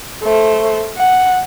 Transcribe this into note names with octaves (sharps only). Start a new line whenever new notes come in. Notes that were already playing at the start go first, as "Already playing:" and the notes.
A3 C5
F#5